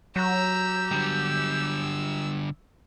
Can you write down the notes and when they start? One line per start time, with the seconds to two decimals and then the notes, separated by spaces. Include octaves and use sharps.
0.16 F#3 G4 A#5 E6
0.91 D3 G3 E6